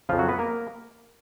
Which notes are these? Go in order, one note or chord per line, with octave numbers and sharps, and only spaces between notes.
F2 C#3 F3 F4
F#3 F#4
B3 B4
A#3 A#4